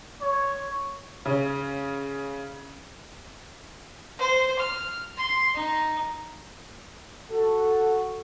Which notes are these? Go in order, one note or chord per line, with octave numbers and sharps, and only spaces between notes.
C#5
C#3 C#4
C5
F6
C6
D#4
F#4 A4